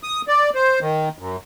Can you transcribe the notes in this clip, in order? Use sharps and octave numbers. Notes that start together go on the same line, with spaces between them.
D#6
D5
C5
D#3
F#2